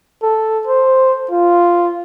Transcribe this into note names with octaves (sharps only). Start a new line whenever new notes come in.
A4
C5
F4